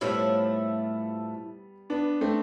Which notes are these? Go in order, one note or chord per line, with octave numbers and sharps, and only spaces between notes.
A2 F3 G3 A3 B3 E4
B3 D4
A3 C4